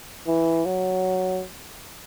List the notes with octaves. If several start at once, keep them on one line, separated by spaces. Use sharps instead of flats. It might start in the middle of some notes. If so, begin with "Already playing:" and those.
E3
F#3